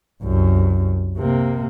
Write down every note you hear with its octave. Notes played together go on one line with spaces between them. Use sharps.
C2 F#2
C3 A#3